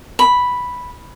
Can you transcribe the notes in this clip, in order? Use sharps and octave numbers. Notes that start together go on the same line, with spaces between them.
B5